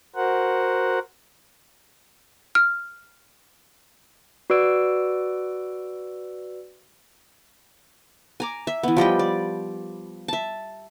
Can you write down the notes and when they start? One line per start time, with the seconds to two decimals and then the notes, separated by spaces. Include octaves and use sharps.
0.16 F#4 A#4 C5 F#5
2.55 F6
4.50 F#4 B4 D5 E6 D7
8.40 G#5 A#5 D6
8.67 E5
8.83 E3 B3
8.97 F3 G3 D#5 G5
9.19 D5
10.28 E5 A5